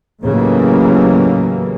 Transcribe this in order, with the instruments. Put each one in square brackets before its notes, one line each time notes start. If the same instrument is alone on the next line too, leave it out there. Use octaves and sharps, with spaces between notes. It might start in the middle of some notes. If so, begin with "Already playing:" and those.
[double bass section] D#2 A2 C#3 E3 F#3 A#3